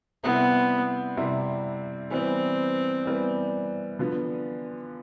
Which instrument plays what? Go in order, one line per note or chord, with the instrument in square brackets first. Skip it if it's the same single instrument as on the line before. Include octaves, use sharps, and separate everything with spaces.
[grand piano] C3 G3 C4 E4 [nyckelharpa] B3
[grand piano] C3 G3 C4 E4
[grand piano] E3 G3 B3 [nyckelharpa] C4
[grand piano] E3 G3 B3
D3 F3 B3